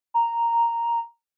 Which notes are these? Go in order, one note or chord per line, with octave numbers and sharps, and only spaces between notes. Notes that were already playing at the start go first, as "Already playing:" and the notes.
A#5